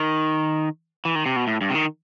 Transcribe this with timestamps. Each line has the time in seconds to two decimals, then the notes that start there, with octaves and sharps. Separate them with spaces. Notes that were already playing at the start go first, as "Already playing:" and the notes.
Already playing: D#3
1.05 E3
1.15 D#3
1.26 C3
1.36 B2
1.47 A2
1.61 G2
1.70 C3
1.75 D#3